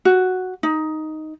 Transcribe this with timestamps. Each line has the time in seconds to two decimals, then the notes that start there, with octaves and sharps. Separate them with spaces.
0.05 F#4
0.63 D#4